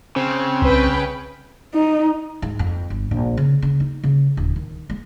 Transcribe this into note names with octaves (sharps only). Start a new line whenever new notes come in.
C#3 C4
C2 B4 G5
D#4
G#2
F2
G1
A#1
C#3
C#3
D#4
C#3
D1
D#3
G#3